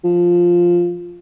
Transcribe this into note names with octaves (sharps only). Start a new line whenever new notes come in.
F3